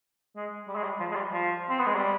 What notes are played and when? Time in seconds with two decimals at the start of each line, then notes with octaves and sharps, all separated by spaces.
0.36 G#3
0.68 G3
0.76 G#3
0.83 G3
1.00 F3
1.12 G#3
1.15 G3
1.32 F3
1.70 C4
1.79 B3
1.86 G#3
1.95 G3